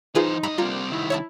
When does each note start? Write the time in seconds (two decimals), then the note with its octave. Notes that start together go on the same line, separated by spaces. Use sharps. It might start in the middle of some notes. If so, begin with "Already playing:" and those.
0.15 E3 D#4 F4 G#4 B4 C5
0.43 G2 D#5 A#5 B5
0.58 D3 F3 G3 A#3 C4 F4 A#5
0.91 C2 D#3 E4
1.10 C#5 E5 A5